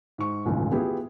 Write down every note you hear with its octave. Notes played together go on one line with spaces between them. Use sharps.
G#2 C#6
D#1 G#1 C#2 E3 A3
B3 E4 F4 G4 G#4